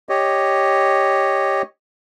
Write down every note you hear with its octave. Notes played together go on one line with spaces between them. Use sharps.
G4 C#5 D#5